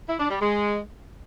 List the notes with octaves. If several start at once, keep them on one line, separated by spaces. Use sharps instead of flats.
E4
D4
G3
G#3